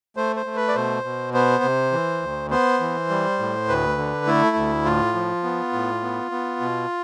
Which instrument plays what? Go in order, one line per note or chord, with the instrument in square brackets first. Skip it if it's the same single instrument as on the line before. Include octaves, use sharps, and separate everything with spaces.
[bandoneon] A3 C5
C5
A3
B4
D5
B2 C5
B2
B3 C5
C3
E3
D2
B3 C5
E3
G3
A2
D2 B4
D3
A3 E4
D2
A2 F4
F3
B3
A2
B3
B3
B2